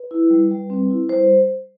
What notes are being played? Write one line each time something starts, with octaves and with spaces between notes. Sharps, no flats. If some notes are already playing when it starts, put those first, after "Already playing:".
Already playing: B4
E4
G3
G3
C4
E4
G3 C5